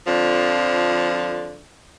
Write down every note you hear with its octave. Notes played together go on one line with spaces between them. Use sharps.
F2 D3 F3